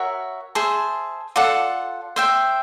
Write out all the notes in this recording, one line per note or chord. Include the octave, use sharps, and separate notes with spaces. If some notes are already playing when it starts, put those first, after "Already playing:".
Already playing: F#4 A#4 C#5 E5
G#4 C5 E5 A5
F4 A4 D5 F#5
C5 E5 G5